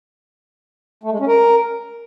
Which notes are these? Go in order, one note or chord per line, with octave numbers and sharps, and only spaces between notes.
A3
G#3
C#4
A#4